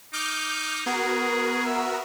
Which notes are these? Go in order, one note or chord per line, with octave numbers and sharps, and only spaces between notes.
D#4 D6 F6 G6
B3 F#4 G#4 A#4
E5